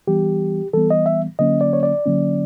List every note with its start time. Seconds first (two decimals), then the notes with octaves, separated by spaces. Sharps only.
0.07 E3 G3 B3 G4
0.73 E3 G3 B3 A4
0.90 D#5
1.06 E5
1.39 D3 F#3 A#3 C#4 D#5
1.61 D5
1.73 C#5
1.83 D5
2.06 D3 F#3 A#3 C#4